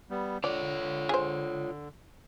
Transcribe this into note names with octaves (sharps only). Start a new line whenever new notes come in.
G3 B3
D3 F4 C#5 D5
G#4 C5